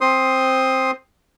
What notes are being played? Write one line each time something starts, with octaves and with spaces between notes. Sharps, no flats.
C4 C5 C6 D#6